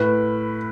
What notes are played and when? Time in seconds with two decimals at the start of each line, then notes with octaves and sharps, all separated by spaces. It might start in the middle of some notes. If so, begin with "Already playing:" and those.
Already playing: A2 B4